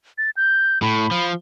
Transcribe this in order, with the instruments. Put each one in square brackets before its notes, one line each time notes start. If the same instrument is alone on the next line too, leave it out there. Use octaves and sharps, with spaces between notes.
[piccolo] A6
G6
[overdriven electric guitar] A2 [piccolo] B5
[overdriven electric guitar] F3